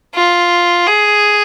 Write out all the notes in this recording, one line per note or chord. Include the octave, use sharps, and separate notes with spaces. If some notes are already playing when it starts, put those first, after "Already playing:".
F4
G#4